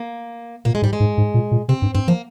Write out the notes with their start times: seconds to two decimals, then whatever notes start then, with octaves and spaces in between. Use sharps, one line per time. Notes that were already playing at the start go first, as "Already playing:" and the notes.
Already playing: A#3
0.65 A#2 A#3
0.75 G#3
0.82 G#2 G3
0.93 G#3
1.00 G#2
1.18 G#2
1.34 A#2
1.51 A#2
1.68 C3 C4
1.82 G2
1.95 G2 C4
2.07 F3 A#3